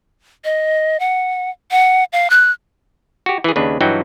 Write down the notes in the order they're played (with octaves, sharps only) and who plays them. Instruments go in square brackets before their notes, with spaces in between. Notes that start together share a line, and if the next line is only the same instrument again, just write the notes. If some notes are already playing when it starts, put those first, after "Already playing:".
[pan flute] D#5
F#5
F#5
F5
F#6
[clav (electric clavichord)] F#4 G4
E3 G#4
D#2 C#3 D4 B4
G2 E3 F#3 D#4 F#4 G5